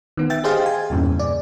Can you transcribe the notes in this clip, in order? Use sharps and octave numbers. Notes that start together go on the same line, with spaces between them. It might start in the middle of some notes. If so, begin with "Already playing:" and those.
D#3 B3
E5 G5 A6
G4 G#4 C5 D#5 F5 G5
G#5
E2 G2 A#2 C#3 E3
D5